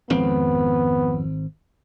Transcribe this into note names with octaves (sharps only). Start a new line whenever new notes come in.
G#1 F2 B3 C4